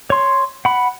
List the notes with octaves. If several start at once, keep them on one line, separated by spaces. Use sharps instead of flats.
C#5 C6
F#5 B5